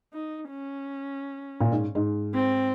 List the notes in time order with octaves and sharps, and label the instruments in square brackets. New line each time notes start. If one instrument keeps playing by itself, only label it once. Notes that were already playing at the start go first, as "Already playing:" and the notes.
[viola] D#4
C#4
[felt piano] A#2
G#2
G#2
[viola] C4